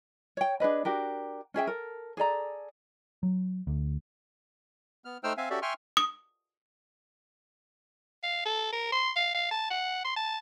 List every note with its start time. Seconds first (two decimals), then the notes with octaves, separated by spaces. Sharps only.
0.37 C#5 G5
0.60 D4 G#4 B4 D#5
0.85 D4 F#4 G4 A#4
1.54 C#4 G#4 E5 G5
1.67 A4 A#4
2.17 G#4 A4 D5 A#5
3.23 F#3
3.67 D2
5.05 B3 F6
5.24 A3 D#4 C5 G5 E6 F6
5.37 C4 E5 F5 G#5
5.50 C#4 F#4 G4 A4 D5 E5
5.62 E5 G5 G#5 C6 C#6 F6
5.97 D#6
8.23 F5
8.45 A4
8.73 A#4
8.92 C6
9.16 F5
9.34 F5
9.51 A5
9.70 F#5
10.04 C6
10.16 A5